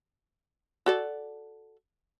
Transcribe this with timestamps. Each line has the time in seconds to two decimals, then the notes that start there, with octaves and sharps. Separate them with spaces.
0.86 F#4 A4 D5